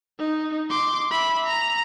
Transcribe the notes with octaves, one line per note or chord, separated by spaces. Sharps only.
D#4
C6 D6
E5 B5
A#5